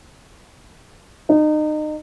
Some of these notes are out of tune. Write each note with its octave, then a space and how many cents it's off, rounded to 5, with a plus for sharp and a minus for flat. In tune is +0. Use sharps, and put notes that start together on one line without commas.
D#4 -30